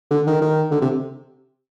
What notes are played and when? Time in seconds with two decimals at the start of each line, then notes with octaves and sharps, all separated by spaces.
0.11 D3
0.27 D#3
0.41 D#3
0.71 D3
0.81 C3